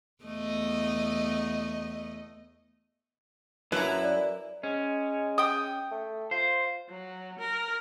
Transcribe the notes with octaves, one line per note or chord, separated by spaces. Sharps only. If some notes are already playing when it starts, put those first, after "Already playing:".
E2 A3 D#5
F#2 E4 B4 A#5
D5
G#3 C#4
G5 D#6
A3
F4 C5
F#3
A#4